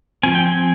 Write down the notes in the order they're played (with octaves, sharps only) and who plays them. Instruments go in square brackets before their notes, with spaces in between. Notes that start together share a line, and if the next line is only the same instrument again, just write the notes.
[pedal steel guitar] F3 C4 G#5
G5
G#5